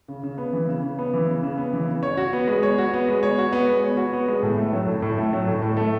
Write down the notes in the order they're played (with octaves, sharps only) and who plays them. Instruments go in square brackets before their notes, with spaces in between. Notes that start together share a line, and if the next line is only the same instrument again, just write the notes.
[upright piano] C#3
C#3
B3
E3
C#3
C#3
B3
E3
C#3
C#3
B3
E3
C#3
C#5
F#4
B3
G#3
C#5
F#4
B3
G#3
C#5
F#4
B3
G#3
C#5
F#4
B3
G#3
A2
A3
F#3
A2
A2
A3
F#3
A2
A2
A3